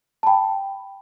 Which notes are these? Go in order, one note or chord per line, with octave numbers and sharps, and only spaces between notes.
A5
G5 B5